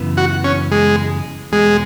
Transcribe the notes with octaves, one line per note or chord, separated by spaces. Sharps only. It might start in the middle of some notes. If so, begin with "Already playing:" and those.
Already playing: F#2 C#3 E3 B3
F#4
C#4
G#3
E2 B2 F#3 G#3